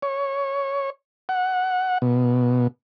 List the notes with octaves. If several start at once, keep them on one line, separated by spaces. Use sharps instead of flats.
C#5
F#5
B2